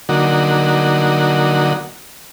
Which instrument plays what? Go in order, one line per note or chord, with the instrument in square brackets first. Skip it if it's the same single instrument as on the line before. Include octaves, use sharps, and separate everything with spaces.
[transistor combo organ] D3 F#3 A#3 D#4 F#4